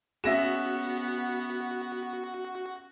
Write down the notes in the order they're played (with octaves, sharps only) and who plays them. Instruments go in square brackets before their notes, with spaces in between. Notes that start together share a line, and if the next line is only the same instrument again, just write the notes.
[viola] B3 [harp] C#4 G#4 [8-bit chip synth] F#4 [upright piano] E5 A#6 E7